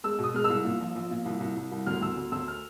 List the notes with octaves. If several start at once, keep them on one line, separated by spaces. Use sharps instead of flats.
G#3 E6
B2
D#6
G#3 F6
E6
C2
A#2
A#1
A#1
A#2
C2
C2
C2
C2
D2 F6
D2 E6
D2
D2 E6
F6